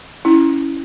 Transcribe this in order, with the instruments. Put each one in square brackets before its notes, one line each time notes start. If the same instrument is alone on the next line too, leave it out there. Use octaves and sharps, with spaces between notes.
[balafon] C#4 E4